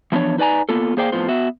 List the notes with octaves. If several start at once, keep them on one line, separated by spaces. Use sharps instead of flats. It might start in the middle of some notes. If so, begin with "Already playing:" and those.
E3 F3 B3 D4 C#5
D#4 B4 D5 G#5 A#5
A#3 B3 F4 A4
A#3 G#4 C5 D5 F5 G5
F2 A2 B3 F4 C5
B3 F#4 E5